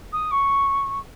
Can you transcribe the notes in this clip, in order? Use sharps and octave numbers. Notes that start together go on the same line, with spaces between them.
D#6
C#6